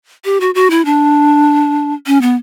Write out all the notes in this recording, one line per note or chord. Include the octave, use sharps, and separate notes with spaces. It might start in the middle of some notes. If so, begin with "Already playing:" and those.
G4
F#4
F#4
E4
D4
C#4
B3